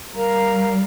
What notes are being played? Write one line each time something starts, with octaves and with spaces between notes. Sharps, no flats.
G3 A#4 F5 A#5